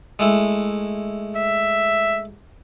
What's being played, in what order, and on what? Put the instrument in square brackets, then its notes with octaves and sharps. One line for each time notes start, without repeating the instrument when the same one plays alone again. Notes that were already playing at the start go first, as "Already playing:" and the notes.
[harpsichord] G#3 A3 E4
[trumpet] E5